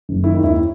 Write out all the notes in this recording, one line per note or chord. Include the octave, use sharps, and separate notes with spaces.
F#1
D#3 E4
D#2 E4